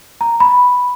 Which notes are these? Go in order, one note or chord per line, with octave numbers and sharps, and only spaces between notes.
A#5
B5